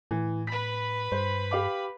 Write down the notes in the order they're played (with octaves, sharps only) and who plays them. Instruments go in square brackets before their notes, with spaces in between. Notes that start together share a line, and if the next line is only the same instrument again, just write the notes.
[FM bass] A2 [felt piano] E3
[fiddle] B4 B5 [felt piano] B6
[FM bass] G2 [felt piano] C5
[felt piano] G4 F5 D6